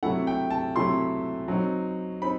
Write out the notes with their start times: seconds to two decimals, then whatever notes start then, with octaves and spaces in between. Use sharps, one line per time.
0.03 C3 F#3 A3 E4 F#5
0.27 G5
0.50 A5
0.75 C3 F#3 A3 E4 C6
1.48 F#3 C4 D#4
2.22 C4 D#4 B5